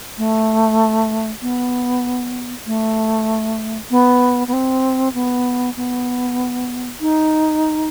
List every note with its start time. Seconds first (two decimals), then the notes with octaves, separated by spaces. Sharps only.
0.18 A3
1.42 B3
2.66 A3
3.90 B3
4.47 B3
4.53 C4
5.14 B3
5.77 B3
7.01 D#4